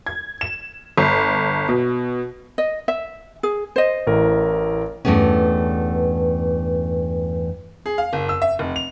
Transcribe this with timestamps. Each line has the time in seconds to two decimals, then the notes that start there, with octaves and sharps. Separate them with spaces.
0.06 G#6
0.41 E7
0.98 G1
1.69 B2
2.58 D#5
2.88 E5
3.43 G#4
3.76 C5 D#5
4.07 A1 A2 A#4
5.05 E2 G2 E3 A3 B3 C#4
7.86 G#4
7.98 F5
8.13 F#1
8.29 E6
8.42 E5
8.59 F1
8.76 F7